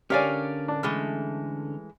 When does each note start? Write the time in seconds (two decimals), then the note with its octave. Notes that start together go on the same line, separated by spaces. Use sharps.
0.10 D3 C#4 G4 A#4 C#5 D5 F5 G#5
0.68 D4
0.83 E3 G#3 A3 F6